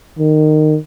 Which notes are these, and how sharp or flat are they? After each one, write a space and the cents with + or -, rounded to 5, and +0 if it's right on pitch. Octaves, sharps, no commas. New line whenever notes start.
D#3 -20